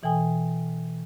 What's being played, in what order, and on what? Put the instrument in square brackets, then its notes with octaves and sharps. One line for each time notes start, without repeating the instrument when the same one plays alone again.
[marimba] B2 E3 A4 G5 G#5 D#6